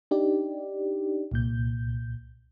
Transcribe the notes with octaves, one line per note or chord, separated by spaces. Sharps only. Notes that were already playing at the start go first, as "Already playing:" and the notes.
D4 D#4 G4 D5
C2 A#2 G6